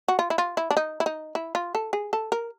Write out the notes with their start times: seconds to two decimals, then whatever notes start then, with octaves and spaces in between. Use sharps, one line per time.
0.08 F#4
0.19 F4
0.30 E4
0.38 F4
0.57 E4
0.71 D4
0.77 D#4
1.00 E4
1.06 D#4
1.35 E4
1.55 F4
1.75 A4
1.93 G#4
2.13 A4
2.32 A#4